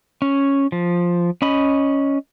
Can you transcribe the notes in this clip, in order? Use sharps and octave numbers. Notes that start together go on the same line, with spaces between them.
C#4
F3
C#4 D#5 B5